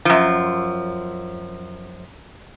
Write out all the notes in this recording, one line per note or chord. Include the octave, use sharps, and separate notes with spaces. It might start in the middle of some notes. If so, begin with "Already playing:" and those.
F#2 F3